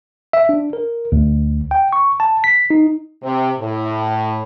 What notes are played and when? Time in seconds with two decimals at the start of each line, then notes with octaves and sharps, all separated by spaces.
0.33 E5
0.49 D4
0.73 A#4
1.12 D2
1.71 G5
1.93 C#6
2.20 A5
2.44 B6
2.70 D#4
3.22 C3
3.59 A2